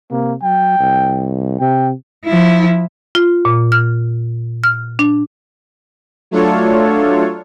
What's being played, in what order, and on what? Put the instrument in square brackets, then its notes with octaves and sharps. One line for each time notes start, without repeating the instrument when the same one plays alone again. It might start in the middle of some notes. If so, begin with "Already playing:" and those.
[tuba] C3 [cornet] A#3
[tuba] F#3 [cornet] G5
[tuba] C2
[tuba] C3 [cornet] G5
[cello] F3 E4
[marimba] F4
A#2
F6
F6
D4
[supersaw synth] F#3 A3 D4 F4 A4 C#5